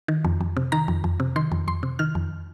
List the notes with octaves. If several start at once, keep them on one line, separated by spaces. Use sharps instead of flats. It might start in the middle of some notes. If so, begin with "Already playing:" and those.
D#3
F2
F2
C3
D#3 A#5
F2
F2
C3
D#3 C6
F2
F2 C6
C3
D#3 F6
F2